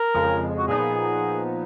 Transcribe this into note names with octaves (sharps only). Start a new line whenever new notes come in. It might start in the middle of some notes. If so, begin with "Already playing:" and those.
Already playing: A#4
F2 C#3 F3 G#3
F#4
A#2 F3 B3 D#4 G#4